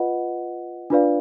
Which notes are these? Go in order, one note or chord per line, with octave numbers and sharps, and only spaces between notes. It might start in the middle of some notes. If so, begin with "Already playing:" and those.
Already playing: F4 B4 D#5 F#5
D4 F4 B4 D5 F5